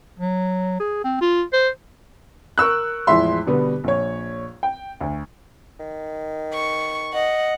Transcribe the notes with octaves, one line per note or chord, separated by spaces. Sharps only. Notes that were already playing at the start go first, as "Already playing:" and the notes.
F#3
G#4
C4
F4
C5
A#4 C#6 E6 F#6
E2 A2 F3 G#3 E5 C6
B2 D3 G3 B3
A#1 C#5
G5
D2
D#3
C#6
D#5 F#5